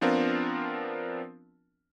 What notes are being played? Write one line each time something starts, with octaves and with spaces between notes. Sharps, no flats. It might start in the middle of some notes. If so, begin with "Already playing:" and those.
F3 B3 C4 D4 F4 A#4